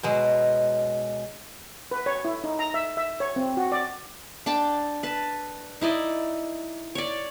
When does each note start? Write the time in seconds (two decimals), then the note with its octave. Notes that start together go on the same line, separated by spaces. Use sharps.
0.03 B2 F#3 G#3
1.91 B4
2.06 C#5
2.25 E4
2.44 D#4
2.59 A#5
2.74 E5
2.97 E5
3.20 C#5
3.36 C4
3.57 F#4
3.72 D5
4.46 D4 G5 A5
5.03 B4 A5
5.81 D#4 E4 D5 D#5
6.95 C#5 D5